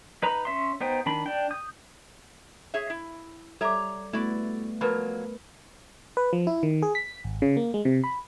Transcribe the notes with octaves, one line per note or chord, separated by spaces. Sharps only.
D#4 B4 A#5 B5
C#4 E5 C6
B3 D#4 C5 G5
D#3 D4 B5
D4 G5
D#6 G6
G#4 C#5 E5
E4
G3 A4 C#5 D5 E5 A#5 D6
A3 B3 E4 F#4 D5
F3 F#3 A#3 A#4 B4 B5
B4
F3
E4
D#3
G#4
B6
G#1
C#3
A#3
G#3
C3
B5